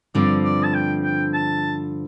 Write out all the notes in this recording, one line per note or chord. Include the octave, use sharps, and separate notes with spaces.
G2 D3 F3 C4 D5
D5
A5
G5
G5
A5